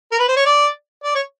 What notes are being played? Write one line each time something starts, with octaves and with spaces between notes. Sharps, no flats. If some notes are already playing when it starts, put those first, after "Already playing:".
A#4
B4
C5
C#5
D5
D5
C#5